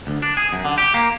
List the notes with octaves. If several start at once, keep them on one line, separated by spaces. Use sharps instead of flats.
D2
D4
G#4
F#2
D3
G4
A#3